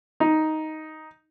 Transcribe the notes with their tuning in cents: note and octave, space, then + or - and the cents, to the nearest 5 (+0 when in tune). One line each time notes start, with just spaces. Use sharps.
D#4 +5